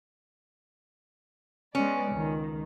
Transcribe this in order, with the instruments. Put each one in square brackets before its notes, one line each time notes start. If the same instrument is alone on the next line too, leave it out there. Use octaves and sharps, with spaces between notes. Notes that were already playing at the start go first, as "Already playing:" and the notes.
[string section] G#3 B3 D5 [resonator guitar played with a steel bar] C#4
[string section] C#2 D#3